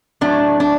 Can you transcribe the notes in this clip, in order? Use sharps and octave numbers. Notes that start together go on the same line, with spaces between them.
A2 F#3 A3 D4
D4